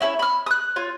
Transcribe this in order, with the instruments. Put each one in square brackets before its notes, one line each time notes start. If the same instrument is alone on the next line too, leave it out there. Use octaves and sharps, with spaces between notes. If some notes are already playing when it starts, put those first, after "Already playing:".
[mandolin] C#4 E4 A4 C#5
B5 F6
D#6 F#6
F4 C#5